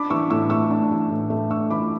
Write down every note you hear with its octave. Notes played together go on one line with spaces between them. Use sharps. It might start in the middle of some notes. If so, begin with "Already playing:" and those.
Already playing: D4 B5 D6
E3 C#6 E6
A2 C#6 E6
A3 C#6 E6
D4
E3
A2
A3
D4 C#6 E6
E3 B5 D6